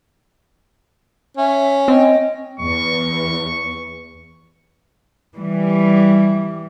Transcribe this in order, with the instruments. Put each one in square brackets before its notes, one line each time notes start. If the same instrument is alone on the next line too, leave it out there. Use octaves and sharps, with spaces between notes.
[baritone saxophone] C#4 [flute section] E5
[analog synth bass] C4 [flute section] D#5 G5
[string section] E2 [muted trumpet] C#6
[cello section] E3 G3